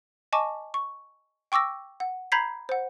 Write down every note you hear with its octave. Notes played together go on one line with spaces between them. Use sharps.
D#5 G#5 A5 C#6 D6
C#6
G5 C#6 D6 E6 A#6
F#5
A#5 B5 G6 G#6 B6 C7
C5 F#5